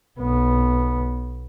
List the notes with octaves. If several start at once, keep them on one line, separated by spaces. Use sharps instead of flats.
B1 B3